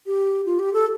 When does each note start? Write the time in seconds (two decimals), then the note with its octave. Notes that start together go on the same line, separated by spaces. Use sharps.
0.06 G4
0.46 F4
0.59 G4
0.74 A4